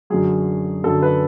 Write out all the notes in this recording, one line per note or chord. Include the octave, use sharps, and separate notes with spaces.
F#2 D3 F#3 G#4
F#2 D3 F#3 A4
B4